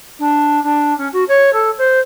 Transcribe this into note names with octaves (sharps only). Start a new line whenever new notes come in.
D4
D4
C#4
F#4
C#5
A4
C5